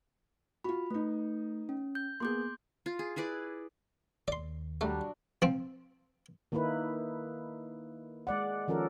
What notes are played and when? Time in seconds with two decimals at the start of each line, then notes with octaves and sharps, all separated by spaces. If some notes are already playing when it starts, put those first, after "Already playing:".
0.64 F4 F#4 B5
0.91 A3 D#4 B4
1.69 C#4
1.95 G6
2.20 A#3 B3 G#4 C6 D6 G6
2.86 F4
2.99 G#4
3.16 E4 G#4 B4 D5
4.28 D#2 D5 C6
4.81 F#3 G3 A3 D4
5.42 F3 C4
6.52 D#3 A#3 D#4 E4 B4
8.27 G#3 D5 F#5
8.68 D#3 F3 C#4 A4 A#4